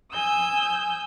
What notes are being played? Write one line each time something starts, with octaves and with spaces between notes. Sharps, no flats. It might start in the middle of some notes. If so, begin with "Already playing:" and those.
G#5 D#6 E6 G6